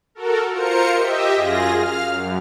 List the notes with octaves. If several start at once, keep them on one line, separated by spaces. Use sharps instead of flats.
F#4 A4 A#4
F4 A#4 C5 C#7
G4 D#5 E5
F#2 F4 G#4 A#6
F5 F6
F#2